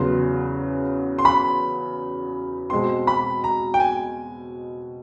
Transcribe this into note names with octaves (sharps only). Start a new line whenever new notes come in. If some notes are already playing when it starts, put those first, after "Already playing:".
Already playing: E2 C#3 F#3 B3 C6
C6
B5
B2 G#3 C4 C6
B5
A#5
G5
G#5